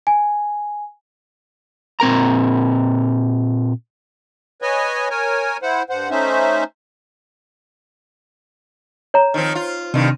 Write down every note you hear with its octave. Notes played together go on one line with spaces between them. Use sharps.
G#5
A#2 C4 A#4 A#5
B4 C#5 D#5 G#5
A#4 C#5 G#5
E4 C5 F#5
G2 C5 F#5
A3 C#4 D#4 C5 E5
C#5 A#5
D#3 F3 C4
F4
G2 C3 D#3